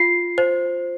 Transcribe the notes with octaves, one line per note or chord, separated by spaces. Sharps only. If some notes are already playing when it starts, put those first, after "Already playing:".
Already playing: F4 C7
C5